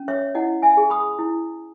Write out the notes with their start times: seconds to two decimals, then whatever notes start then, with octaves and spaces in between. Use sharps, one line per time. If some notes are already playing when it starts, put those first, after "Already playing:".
Already playing: C#4
0.08 C#5 E5
0.35 E4 D#5 F#5
0.62 E5 G#5
0.77 G#4
0.90 B5 D#6
1.19 E4